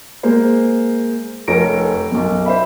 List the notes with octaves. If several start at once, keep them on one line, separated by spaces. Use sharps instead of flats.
G#3 A#3 C5
F1 C#4 A4 A#4 A#6 D7
B1 F#2
C5 E5 B5